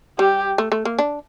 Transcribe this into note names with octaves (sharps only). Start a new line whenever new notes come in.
G3 G4
A3
A3
A#3
D4